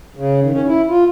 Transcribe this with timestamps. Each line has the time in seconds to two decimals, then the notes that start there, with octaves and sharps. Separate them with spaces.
0.16 C#3
0.42 D#3
0.53 C#4
0.67 E4
0.89 F4